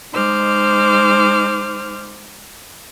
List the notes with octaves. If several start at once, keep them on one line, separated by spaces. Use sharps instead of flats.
G#3 D#4 C5 D6 F6